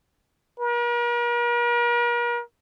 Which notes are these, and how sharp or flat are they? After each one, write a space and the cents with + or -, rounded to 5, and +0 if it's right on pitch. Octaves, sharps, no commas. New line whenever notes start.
A#4 +45